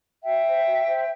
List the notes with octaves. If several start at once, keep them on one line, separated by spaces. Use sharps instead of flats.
F#4 E5 G5
C5
F#4
C5